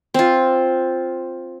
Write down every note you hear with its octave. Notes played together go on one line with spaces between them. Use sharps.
C4 F4